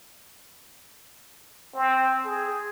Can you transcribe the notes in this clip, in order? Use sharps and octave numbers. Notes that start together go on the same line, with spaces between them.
C4
G#4